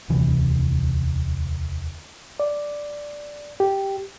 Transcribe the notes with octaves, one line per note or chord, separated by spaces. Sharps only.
E1 D2 C3 E3
D5
G4